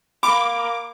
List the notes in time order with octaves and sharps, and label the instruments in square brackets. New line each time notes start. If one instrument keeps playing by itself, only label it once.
[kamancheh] A#3 [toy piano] B5 [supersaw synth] D6